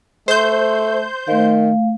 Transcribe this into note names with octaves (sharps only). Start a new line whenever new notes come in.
A3 C5 G6
D#3 A3 F5